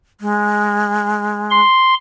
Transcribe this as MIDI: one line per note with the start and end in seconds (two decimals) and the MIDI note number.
0.21 1.60 56
1.50 1.94 84